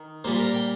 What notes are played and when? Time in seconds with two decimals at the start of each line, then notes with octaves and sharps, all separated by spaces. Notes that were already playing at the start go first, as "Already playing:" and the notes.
Already playing: D#3
0.24 A#2 G3 A#3 C5
0.39 A#4
0.54 G5